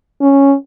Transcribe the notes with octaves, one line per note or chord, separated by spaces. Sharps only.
C#4